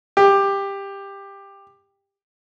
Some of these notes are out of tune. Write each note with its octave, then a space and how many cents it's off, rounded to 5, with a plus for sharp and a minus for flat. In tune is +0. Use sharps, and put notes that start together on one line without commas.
G4 +15